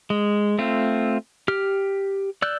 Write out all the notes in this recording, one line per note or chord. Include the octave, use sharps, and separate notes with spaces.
G#3
A3 C4 F4
G4 F6
D5 E6 F#6 G6